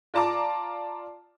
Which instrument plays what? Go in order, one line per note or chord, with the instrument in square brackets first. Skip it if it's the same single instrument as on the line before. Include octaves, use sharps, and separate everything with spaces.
[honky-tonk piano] F4 D5 A5 A#5 D6